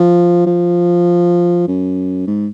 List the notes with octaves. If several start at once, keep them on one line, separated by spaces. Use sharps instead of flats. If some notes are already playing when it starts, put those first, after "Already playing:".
Already playing: F3
F3
F#2
G#2